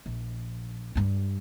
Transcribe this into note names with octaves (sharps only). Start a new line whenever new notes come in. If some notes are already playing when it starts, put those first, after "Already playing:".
A#1
G2 G3